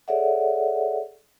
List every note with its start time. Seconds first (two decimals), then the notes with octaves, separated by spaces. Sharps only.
0.08 G#4 A4 C#5 D5 E5 F#5